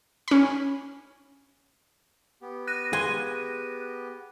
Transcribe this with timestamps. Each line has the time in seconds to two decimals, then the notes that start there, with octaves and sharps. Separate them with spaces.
0.28 C#4 B5
2.41 B3 G4
2.67 F#6 A#6 D#7
2.93 G#4 G#5 C6